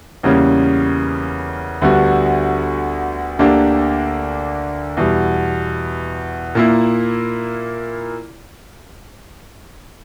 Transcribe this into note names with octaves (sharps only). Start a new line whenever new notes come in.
E2 C#3 G3 A#3 C#4
D2 D3 G3 B3 F#4
D2 D3 A#3 D4 G4
E2 B2 G3
A#2 A#3 E4